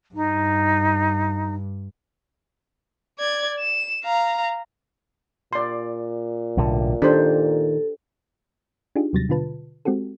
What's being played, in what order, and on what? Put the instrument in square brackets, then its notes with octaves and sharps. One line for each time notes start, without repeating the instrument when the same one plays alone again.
[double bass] G2 [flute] D#4
[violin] D5 G#6
E7
F5 A#5
[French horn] A#2 [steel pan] D5 C6
[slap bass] B1 A2 D3
[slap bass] D#3 [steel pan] D4 G4 C5 [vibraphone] A4
[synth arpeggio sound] D4 D#4 F4 G4 G#4
D#2 C3 F#3 G3 A6 A#6
B2 D3 F4 B4 A5
G#3 C4 F#4 G4 A4